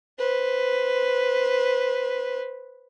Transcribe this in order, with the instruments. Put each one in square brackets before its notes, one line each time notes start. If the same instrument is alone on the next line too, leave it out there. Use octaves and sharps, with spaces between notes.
[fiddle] B4 C5